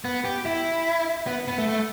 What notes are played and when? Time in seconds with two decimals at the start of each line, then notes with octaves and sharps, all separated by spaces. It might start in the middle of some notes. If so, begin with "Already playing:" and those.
0.05 B3
0.25 G4
0.45 E4
1.27 B3
1.48 B3
1.58 A3
1.68 A3